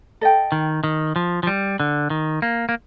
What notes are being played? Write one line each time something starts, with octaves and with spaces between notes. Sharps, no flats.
A4 D#5 G5
D#3
D#3
F3
F3
G3
D3
D#3
A#3
A#3